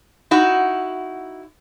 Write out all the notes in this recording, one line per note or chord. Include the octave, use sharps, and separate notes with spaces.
D#4 E4 F#4